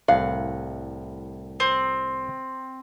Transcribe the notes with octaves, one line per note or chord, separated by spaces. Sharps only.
C2 A2 F5 F#5
C4